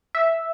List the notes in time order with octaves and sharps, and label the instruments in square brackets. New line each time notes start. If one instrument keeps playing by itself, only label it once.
[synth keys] E5